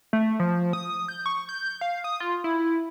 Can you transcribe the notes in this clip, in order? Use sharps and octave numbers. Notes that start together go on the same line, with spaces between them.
A3
F3
D#6
G6
C#6
G6
F5
D#6
F4
E4